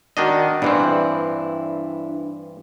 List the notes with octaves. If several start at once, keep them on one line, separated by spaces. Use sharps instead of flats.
D#3 D4 F#4 D5 D#5
G2 E3 C4 D4 E4